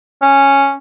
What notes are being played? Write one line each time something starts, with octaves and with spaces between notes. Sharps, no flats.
C#4